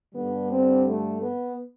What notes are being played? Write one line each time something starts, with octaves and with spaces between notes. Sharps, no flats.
G2 D3 G3 B3
C4
A3
B3